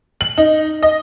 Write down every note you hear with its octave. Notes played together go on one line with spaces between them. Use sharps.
F#7
D#4
D#5